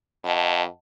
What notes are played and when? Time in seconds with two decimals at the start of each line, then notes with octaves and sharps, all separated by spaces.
0.24 F2 D#5 F#5 A5